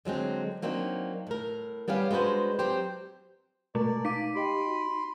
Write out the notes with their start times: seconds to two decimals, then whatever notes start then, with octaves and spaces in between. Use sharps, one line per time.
0.05 D3 F#3 G#3 C4
0.62 F#3 A#3 C4 D4 D#4 F#4
1.27 A2 A#4
1.88 G3 B3 C#4 G4 F5
2.11 G#3 D4 F#4 B4 C5
2.59 F#3 C4 G4 C5
3.75 B2 G#3 A3 D5
4.05 D#4 F5 D6 B6 D7 D#7
4.35 G4 D#5 G5 B5 C6
4.67 F#4